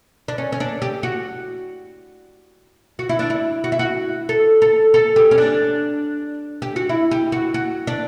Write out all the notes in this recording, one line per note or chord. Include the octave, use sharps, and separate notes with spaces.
D4
C#4
C#4
D4
G4
F#4
F#4
E4
D4
E4
F#4
E4
F#4
A4
A4
A4
G4
C#4
D4
G4
F#4
E4
G4
F#4
F#4
D4